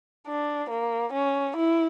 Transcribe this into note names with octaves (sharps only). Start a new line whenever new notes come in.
D4
A#3
C#4
E4